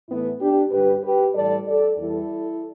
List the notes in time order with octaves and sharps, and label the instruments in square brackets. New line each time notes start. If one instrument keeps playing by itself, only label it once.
[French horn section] A2 E3 A3 B3 E4
D4 G4
G2 D3 G3 G4 B4
G4 B4
A2 E3 G3 A4 D5
A4 D5
E2 E3 G3 E4 A4